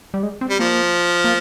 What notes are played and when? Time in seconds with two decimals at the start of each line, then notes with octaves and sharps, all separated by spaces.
0.14 G3
0.23 G#3
0.41 C4
0.50 G3
0.59 F3 A#3
1.24 A#3